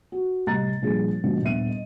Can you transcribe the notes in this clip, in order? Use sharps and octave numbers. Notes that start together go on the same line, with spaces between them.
F#4
C2 A2 G4 D#5 A#5 A6
A#2 F3 G3 D4 G#4
G#2 B2 D3 F3 A#3 C#4
D#1 B3 D4 E5 D#7
D#5